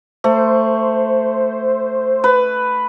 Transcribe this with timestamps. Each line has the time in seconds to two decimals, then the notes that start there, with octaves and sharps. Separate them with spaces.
0.24 A3 C5
2.24 B4